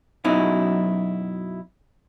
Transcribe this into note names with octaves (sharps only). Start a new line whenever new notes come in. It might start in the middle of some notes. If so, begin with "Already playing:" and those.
F#2 B2 F#3 D#4 E4